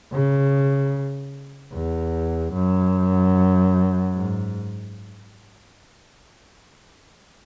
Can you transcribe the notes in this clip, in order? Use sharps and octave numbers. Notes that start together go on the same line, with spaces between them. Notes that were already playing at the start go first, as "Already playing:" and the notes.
C#3
E2
F#2
G#2